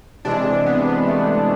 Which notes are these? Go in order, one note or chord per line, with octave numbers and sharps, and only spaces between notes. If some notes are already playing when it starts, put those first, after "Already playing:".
C3 E3 G#3 D4
B3
A3